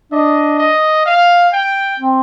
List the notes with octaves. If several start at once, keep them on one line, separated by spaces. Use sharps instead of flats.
D4 D#5
D#5
F5
G5
C4